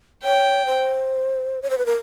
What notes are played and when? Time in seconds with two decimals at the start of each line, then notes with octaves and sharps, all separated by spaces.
0.24 C#5 G5
0.66 C5
1.62 C#5
1.70 C5
1.78 B4
1.86 A#4